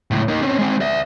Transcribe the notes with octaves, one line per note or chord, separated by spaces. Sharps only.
C#2 A2
A#3 D#4
C4 C#4
G#3 C4
D5 E5